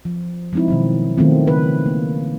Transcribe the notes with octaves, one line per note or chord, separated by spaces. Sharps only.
F3
F3 G#3 C4 D#4 E4
B2 D#3 F#3
D#3 F#3 A3 B3 C4 F4
C#3 B4
A#3